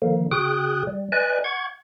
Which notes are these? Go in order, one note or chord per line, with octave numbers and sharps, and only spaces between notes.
D3 D#3 F3 A#3
C#3 F#4 G#4 G5 D#6 F#6
G3
B4 D5 D#5 G#5 F#6
F#5 C#6 G#6